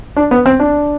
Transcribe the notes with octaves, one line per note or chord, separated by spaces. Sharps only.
D4
B3
C4
D4